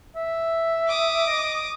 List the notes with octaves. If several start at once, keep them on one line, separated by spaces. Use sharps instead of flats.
E5
D6 D#6
D#5